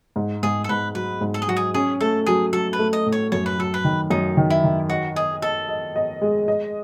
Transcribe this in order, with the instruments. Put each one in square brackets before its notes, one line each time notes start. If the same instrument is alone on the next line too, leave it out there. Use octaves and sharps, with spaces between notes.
[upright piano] G#2
[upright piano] G#2 [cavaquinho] G#4
[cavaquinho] A4
[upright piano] G#2 [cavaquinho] B4
[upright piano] F#3 [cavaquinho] B4
[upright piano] G#2
[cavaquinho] A4
G#4
[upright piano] F#3 [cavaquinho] F#4
[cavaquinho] G#4
[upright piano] C#4 [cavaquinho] G#4
[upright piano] A3 [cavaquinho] A4
[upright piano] F#3 [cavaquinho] G#4
[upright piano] F#3 [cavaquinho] A4
[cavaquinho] B4
[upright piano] A3
[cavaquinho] D#5
[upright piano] A2
[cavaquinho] C#5
[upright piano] F#2 [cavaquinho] C#5
[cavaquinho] B4
[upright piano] F#3 [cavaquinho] A4
[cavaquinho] B4
[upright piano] D#3
[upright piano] F#2 [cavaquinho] D#4
[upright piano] D#3
[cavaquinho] E4
[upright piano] D#3
[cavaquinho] F#4 [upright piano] D#5
[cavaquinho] G#4 [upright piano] D#5
[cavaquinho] A4 [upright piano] D#5
[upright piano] D#5
D#5
G#3
D#5